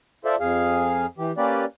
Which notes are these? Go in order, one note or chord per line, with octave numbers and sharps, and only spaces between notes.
F4 A4 C5 D5 E5
F2 G#4 F5
E3 G4
A#3 C#4 G4 B4 D5